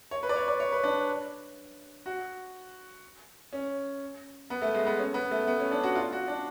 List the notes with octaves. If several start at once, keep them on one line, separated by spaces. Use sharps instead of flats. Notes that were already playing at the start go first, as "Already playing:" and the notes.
C#5
B4
D5
C#5
D5
C#5
B4
D4
F#4
C#4
B3
A3
G#3
B3
C#4
B3
A3
B3
C#4
D4
F#4
F4
F#4
D4